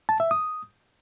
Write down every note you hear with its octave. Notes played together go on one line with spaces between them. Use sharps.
A5
E5
D#6